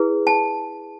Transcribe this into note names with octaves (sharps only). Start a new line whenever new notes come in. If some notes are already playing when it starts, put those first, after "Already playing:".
Already playing: E4 G#4 B4
A5